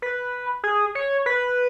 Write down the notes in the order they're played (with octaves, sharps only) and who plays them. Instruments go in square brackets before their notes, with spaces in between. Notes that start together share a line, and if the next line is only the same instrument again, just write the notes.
[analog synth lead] B4
G#4
C#5
B4